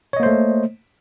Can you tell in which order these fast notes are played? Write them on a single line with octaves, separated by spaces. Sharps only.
C#5 D#5 A#3 C5 A3